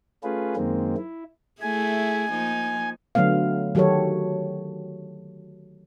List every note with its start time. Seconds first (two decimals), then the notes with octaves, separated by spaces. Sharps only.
0.23 A3 C#4 F4 G#4 B4
0.56 F#2 D#3 G#3 A#3 C4
0.97 E4
1.61 A3 E4 G#4 G#5
2.31 F3 A#3 D#4
3.15 D3 F#3 A3 B3 F5
3.75 D#3 F#3 F#4 G4 A4 C#5